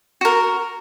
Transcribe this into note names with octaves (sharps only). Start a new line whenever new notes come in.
F#4 A#4